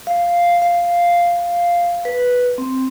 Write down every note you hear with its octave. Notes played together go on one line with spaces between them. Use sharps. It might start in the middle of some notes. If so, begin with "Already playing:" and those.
F5
F5
B4
C4